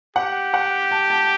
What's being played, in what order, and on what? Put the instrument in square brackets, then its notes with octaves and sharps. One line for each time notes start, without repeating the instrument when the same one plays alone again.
[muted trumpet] G4 [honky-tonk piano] F#5
[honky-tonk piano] F#5
A5
A5